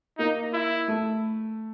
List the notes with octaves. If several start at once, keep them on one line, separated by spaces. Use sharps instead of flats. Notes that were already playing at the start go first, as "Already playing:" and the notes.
A#3 D#4
E4
A3